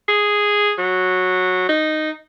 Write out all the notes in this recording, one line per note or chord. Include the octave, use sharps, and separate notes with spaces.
G#4
F#3
D#4